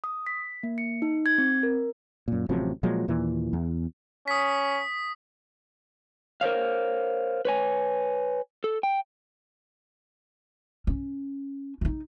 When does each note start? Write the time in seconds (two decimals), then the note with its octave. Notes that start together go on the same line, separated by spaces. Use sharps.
0.04 D#6
0.27 B6
0.63 A#3
0.78 C#7
1.02 D#4
1.26 G#6
1.38 C4
1.63 A#4
2.28 F#2 A#2
2.49 A1 C3 F3 F#3
2.83 A#2 F3 F#3 G#3
3.08 D#2 A#2 E3
3.53 E2
4.28 C#4 D#6 B6
6.41 A#4 C5 C#5 F5
7.45 B4 C#5 G#5
8.64 A4
8.83 G5
10.87 C#4
11.81 D#4 F4